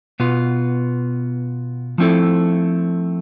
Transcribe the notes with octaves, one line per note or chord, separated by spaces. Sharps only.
B2 B3 F4
F3 A3 C4 E4 A4